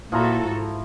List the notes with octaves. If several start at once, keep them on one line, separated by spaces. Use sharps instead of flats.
A#2 F3 E4 F#4 A4 A#5
G#2